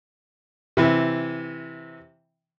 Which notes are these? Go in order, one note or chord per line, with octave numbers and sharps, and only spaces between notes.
C3 E3